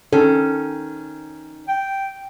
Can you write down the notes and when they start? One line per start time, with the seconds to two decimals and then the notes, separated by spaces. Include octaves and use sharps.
0.13 D#3 C#4 A4
1.68 G5